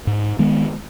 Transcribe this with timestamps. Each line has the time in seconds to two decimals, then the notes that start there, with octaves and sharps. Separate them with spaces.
0.07 G#2
0.39 D#3 G#3 B3